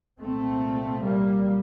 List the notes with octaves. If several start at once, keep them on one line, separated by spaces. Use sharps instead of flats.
C2 A#2 A3 C4
G3 A#3